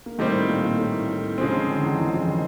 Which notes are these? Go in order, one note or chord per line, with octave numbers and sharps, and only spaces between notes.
A#3
A2 D#3 G3 A3 C4
A#2 A#3
A#2 A#3
A2 A3
A2 A3
C#3 F3 G#3 C4
D#3
D3
E2 E3
E2 E3
F2 F3
D#3